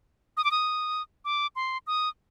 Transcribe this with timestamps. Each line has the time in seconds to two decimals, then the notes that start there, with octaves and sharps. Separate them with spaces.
0.37 D#6
0.44 D6
0.51 D#6
1.25 D6
1.56 C6
1.87 D#6